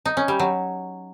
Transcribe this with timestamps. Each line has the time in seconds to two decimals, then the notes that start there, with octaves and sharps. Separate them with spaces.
0.05 D#4
0.17 C#4
0.28 G3
0.39 F#3